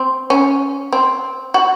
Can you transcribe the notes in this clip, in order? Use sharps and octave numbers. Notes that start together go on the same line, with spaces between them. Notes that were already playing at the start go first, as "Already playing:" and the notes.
Already playing: C4
C#4
C4
F#4